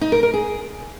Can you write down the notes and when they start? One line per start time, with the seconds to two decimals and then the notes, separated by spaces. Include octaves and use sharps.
0.01 D#4
0.12 A#4
0.23 A#4
0.34 G#4